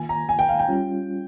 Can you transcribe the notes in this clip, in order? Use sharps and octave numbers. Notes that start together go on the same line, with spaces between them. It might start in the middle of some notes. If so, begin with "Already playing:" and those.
Already playing: D#3 A#3 F4 G#5
A#5
G#5
G5
F5
G5
G3 C#4 F4